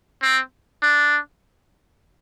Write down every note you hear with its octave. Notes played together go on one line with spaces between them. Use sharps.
C4
D4